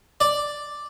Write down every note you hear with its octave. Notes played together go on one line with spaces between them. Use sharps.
D5